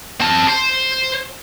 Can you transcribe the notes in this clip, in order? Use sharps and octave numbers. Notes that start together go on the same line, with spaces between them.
C4 A5
C5